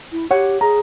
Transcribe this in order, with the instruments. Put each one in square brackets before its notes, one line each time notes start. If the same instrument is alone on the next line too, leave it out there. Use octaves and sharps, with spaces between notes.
[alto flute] E4
[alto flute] G4 [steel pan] C#5 F#5
[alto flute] G#4 [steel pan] A#5